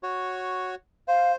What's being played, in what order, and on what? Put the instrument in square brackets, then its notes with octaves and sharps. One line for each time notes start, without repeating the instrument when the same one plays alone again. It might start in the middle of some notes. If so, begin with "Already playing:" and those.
[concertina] F#4 C#5
[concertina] C5 [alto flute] F5